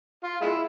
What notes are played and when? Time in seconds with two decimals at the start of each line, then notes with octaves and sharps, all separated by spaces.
0.24 F4
0.41 G#3 E4